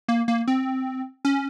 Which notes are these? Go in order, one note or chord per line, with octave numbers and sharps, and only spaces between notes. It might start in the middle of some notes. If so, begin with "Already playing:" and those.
A#3
A#3
C4
C#4